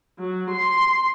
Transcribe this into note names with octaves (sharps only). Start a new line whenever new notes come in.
F#3
C6